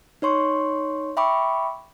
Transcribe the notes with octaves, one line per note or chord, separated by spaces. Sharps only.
D#4 C#5 C6 C#6
E5 G5 B5 C#6 D6